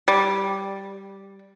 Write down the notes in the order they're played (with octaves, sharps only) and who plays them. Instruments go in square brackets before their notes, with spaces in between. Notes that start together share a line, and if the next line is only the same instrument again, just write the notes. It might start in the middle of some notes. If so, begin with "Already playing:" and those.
[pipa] G3